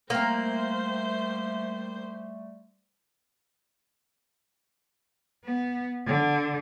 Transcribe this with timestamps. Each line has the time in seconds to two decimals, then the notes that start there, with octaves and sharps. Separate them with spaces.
0.10 G3 A3 A#3 C4 C5
5.44 B3
6.06 D3